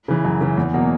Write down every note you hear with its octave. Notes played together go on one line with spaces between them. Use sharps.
C#3 E3
F#2
C#3 E3
E2
B2 F#3 A#3